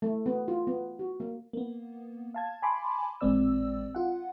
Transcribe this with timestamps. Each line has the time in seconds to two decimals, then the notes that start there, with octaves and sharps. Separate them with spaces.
0.02 A3
0.26 B3
0.48 F4
0.67 B3
0.99 F#4
1.20 A#3
1.53 A#3 B3
2.34 F5 A5 G#6
2.62 G#5 A5 B5 C6 D6
3.21 A1 A#2 G#3 C4 D5 E6
3.95 F4 F#5